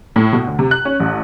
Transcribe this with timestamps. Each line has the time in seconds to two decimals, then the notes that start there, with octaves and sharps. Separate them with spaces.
0.16 A2
0.33 B2
0.47 D2
0.59 C3
0.71 F#6
0.85 C#4
1.00 A1